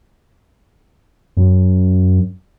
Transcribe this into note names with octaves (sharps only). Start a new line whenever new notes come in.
F#2